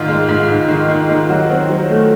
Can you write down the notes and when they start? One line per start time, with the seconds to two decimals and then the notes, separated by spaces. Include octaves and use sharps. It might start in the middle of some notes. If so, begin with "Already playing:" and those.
Already playing: G#2 D#3 F4
0.08 G#3
0.29 G#2
0.49 G#2
0.68 D#3
0.88 D#3
1.09 D#3
1.29 F#3 F#4
1.49 C4
1.69 F#3
1.89 A3